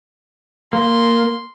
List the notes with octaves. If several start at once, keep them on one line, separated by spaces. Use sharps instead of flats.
A#3 C6